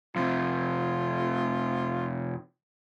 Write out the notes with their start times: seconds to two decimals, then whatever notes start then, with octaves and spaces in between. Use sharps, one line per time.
0.16 F2 C3 F4